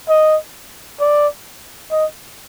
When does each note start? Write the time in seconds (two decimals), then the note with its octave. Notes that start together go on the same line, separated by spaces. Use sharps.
0.09 D#5
1.00 D5
1.91 D#5